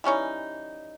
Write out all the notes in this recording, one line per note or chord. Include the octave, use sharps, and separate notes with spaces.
E3 G3 C#4 D#4